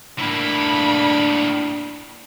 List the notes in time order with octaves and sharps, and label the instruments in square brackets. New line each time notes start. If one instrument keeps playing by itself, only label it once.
[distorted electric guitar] A2 A#3 [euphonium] D4 [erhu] B5